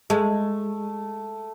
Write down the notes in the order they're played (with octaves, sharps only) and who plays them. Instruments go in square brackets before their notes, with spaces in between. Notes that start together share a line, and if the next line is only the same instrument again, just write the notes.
[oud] G#3 [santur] A3